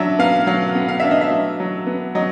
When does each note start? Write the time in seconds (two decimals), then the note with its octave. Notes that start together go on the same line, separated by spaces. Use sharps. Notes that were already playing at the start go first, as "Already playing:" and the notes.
Already playing: F#3 D4 E5
0.19 B3 F5
0.47 F#3 F5
0.75 B3
0.88 F5
1.00 D4 E5
1.11 D#5
1.21 E5
1.30 F#3
1.60 F#3
1.87 B3
2.15 F#3 D#5